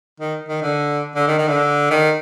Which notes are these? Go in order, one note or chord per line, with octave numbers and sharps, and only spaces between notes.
D#3
D#3
D3
D3
D#3
D#3
D3
D#3